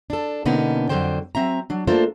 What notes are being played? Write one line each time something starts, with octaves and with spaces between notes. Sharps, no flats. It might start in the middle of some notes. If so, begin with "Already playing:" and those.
D4 A4
B2 D3 A#3 B3 C#4 D#4
F2 G#2 D3 F#3 C5 G5
F#3 C4 E5 A#5
F#3 D4
A3 A#3 D4 F4 A4 C5